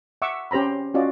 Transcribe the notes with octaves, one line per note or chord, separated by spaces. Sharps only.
E5 F#5 C#6 D6 E6
C#4 G4 C5 A#5 B5
C#4 F4 F#4 D5 D#5